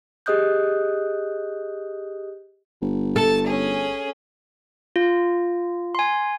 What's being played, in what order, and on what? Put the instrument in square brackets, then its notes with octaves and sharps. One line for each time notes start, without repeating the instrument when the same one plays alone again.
[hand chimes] G4 G#4 D#5 D#6 F#6 G6
[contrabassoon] G1
[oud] A4 [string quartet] A5
[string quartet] C#4 G#4
[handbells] F4
G#5 C6